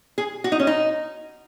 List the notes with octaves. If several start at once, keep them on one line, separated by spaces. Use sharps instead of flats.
G#4
F#4
D#4
C#4
D#4